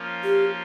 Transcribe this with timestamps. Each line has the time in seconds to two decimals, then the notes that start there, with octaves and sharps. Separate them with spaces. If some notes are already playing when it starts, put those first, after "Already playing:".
Already playing: F3 A#3 C#4 F4
0.23 G4